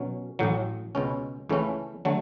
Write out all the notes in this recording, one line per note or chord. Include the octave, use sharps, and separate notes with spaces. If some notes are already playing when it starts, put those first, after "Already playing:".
Already playing: B2 F#3 C#4
A1 A2 F#3
C#2 B2 G#3 C#4
C#2 C#3 E3 A3 C#4
D3 F#3 A3